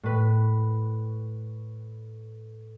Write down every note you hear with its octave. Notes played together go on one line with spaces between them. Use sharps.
A2 B4